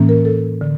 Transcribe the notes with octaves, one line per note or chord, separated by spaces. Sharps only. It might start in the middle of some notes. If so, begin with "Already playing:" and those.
Already playing: A2 E3 A#3 C#4
A#4
A4
D3